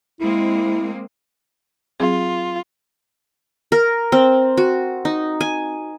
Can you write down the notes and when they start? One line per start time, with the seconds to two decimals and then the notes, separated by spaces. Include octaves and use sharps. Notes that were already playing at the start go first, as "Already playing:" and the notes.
0.21 G#3 A#3 C4 E4
2.00 F#3 C4 F4 G#4
3.72 A#4
4.12 C4
4.57 F#4
5.05 D#4
5.41 G#5